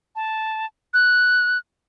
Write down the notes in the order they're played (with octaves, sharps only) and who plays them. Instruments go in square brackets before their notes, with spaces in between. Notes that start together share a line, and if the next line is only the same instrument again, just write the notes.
[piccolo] A5
F#6